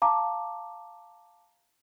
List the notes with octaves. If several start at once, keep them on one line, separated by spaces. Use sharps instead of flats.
F5 A5 A#5 D6